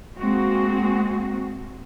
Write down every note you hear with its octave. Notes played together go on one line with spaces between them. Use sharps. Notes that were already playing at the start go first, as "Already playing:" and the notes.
G#3 A#3 C4 F#4